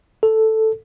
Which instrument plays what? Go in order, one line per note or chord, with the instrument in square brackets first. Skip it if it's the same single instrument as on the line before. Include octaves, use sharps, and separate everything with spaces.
[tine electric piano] A4